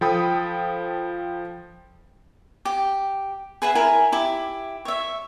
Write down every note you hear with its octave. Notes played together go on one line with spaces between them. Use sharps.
F3 A4 G5 B5 D#6
G4
G#4 B4 E5 F#5
E4 A#4 G#5
E4 G4
C#5 E5